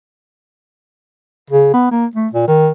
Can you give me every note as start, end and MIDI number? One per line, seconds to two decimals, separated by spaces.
1.50 1.69 49
1.74 1.91 59
1.91 2.06 58
2.16 2.28 57
2.33 2.47 46
2.48 2.69 51